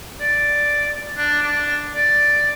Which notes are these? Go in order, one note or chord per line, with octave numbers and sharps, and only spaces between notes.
D5
D4
D4
D5